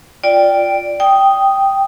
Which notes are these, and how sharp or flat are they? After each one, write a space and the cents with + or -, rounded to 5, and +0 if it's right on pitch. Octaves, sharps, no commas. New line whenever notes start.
F4 +0 D5 +0 G5 +0
G5 +0 D#6 +0